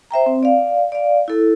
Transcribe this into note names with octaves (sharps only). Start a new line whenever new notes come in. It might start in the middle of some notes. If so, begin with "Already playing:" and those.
C5 E5 G5 A#5
C4
D5 F5
D5 F5
E4 A4